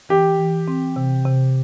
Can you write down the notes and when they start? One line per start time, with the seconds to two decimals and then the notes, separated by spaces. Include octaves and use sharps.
0.09 E3 G4
0.39 E3
0.68 C4
0.96 C3
1.26 C3